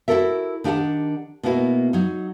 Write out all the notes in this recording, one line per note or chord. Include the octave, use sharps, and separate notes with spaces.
E4 F#4 G4 A4 A#4 E5
D#3 D4 G4 F5 F#5 A5
B2 A#3 B3 E4 F#4
F#3 D#4